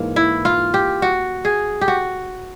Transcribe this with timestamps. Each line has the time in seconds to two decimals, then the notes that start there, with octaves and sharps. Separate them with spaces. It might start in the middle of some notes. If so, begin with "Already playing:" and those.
Already playing: G#2 E3 A#3
0.16 E4
0.45 F4
0.74 G4
1.02 F#4
1.45 G#4
1.81 G4
1.88 F#4